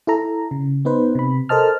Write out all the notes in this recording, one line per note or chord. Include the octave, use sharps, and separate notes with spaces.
E4 A4 A#5
C#3
B3 D#4 B4 C5
C3 B5
A4 A#4 C5 D#5 A5 F6